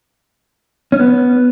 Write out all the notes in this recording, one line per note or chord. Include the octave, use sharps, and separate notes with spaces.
C#4
B3